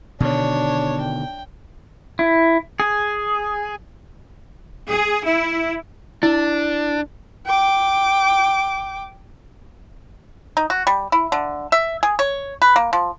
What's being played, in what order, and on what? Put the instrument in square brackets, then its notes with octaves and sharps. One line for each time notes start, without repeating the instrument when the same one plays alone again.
[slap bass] B2 D3 D#3 [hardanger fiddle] D4 C#5
[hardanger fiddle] G5
[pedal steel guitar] E4
G#4
[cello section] G#4
E4
[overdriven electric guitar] D4 [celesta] E4
[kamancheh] G5 D6
[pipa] D#4
F#4
G3
E4
D3
E5
G#4
C#5
B4
A#3
F3